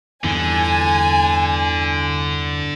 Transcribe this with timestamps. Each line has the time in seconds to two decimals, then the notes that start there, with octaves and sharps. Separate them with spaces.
0.24 E2 G2 D3 E3 G#5